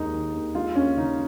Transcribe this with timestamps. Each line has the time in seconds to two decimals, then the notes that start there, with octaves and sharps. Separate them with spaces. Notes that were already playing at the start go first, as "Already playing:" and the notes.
Already playing: D#2 G#3 D#4
0.14 D#3
0.34 D#2
0.55 G#3 F4
0.76 D#2 C#4
0.97 C#3 D#4